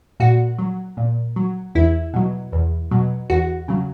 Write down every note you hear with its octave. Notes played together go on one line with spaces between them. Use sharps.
A#2 F#4
F#3
A#2
F#3
E2 E4
B2 F#3
E2
B2 F#3
E2 F#4
C#3 F#3